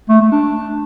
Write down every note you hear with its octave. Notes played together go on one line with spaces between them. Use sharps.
A3
A3
D4